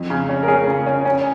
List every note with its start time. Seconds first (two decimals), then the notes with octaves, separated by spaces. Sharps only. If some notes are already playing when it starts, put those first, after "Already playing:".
Already playing: F2
0.10 C#3
0.29 C#4
0.43 A#4
0.48 C#4 G#4
0.67 C#3
0.86 C#4
1.05 C#4